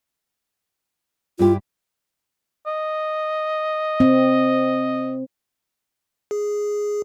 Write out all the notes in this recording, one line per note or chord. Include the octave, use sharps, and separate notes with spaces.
G2 E4 F4 G4
D#5
C4
G#4